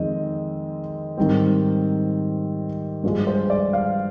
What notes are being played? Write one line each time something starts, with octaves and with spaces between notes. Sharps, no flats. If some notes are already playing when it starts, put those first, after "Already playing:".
Already playing: F2 D#3 G#3 C4 D#5
G#2 D#3 G3 C4
G2 F3 G#3
C5
D5
F5